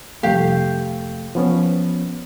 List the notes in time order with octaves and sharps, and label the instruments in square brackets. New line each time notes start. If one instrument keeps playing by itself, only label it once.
[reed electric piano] C2 F2 A3 [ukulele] G4 F5
[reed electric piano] F3 B3 C#4